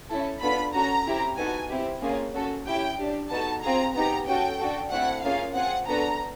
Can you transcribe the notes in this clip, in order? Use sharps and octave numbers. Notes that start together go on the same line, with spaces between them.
C#4 E4 A4
B3 D4 F4 A4 B5
C#4 F#4 A4 A#5
C4 E4 G4
B3 D#4 F#4 A4 G#5
C4 E4 G4
A#3 C#4 F4 G#4
C#4 F#4 A4
C#4 E4 G4 G5
D4 G4
B3 D#4 F#4 A4 A5
C4 F4 G#4 A#5
B3 D#4 G4 A#5
C#4 F#4 A4 G5
D4 F#4 A4
A3 C4 E4 F#5
A#3 C#4 F4 G#4 F5
C4 F4 G#4 F#5
B3 D4 F#4 A4 A#5